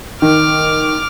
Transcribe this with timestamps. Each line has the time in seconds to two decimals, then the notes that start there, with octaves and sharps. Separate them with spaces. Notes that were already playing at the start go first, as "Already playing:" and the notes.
0.22 D#3 D6 F6